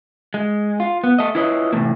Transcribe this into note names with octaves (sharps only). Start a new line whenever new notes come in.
G#3
F4
B3
A3 D#5
E4 F4 B4 C#5 D#5
A2 C3 D#3 E3 A3 A#3